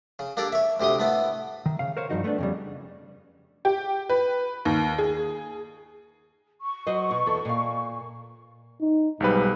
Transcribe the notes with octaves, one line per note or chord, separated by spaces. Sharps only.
C#3
A#3 D4 G4 A4 D5
C#5 E5
D2 C3 G4 C6 D#6
A2 A3 B3
D#3
C#3 F5
A#4 C5 C#5 F5
G2 A#2 F3 D#4 F#4
A3 B3 C4 D4
F2 C#3 G3
G4
B4
D#2
G#4
C#6
F#3 C5 D#5
B2
E2 A4
A#2 F5
D#4
B1 G#2 G3 B4